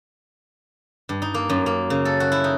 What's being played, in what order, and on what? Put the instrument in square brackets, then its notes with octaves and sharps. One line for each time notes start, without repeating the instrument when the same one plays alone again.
[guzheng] G2
D#4
A#3
F#2
A#3
C#3
A4
F#4
E4
D#4